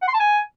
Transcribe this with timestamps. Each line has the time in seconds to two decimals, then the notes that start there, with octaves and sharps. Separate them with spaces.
0.02 F#5
0.08 C6
0.14 A5
0.20 G#5